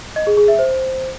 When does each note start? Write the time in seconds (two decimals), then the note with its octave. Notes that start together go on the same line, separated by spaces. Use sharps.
0.16 D#5
0.27 G#4
0.37 G#4
0.48 E5
0.59 C5